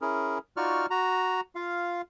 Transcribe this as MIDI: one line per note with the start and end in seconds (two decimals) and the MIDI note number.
0.01 0.38 61
0.01 0.38 64
0.01 0.38 68
0.01 0.38 70
0.57 0.86 63
0.57 0.86 65
0.57 0.86 66
0.57 0.86 74
0.57 0.86 85
0.57 0.86 89
0.90 1.41 66
0.90 1.41 82
1.55 2.02 65
1.55 2.02 77